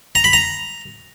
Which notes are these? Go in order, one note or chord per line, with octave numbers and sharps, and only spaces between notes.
A#5
B5
A#5